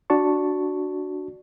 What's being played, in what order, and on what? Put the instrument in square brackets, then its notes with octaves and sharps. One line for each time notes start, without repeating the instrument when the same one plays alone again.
[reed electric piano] D4 F#4 D5 A5 C#6